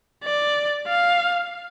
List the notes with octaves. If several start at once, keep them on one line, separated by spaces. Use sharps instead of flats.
D5
F5